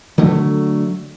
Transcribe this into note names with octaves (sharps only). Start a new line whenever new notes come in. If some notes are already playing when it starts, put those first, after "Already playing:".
D3 F#3 A3